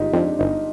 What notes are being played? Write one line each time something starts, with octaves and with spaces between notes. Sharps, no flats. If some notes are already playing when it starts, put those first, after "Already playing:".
Already playing: G1 G#3 D#4 F4 G4
F2 D4
G1 D#4